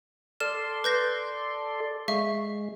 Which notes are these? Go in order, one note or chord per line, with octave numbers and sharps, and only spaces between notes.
A4 D5 C6 F6 E7
B4 G6 A#6
G#3 E5 F5 C#6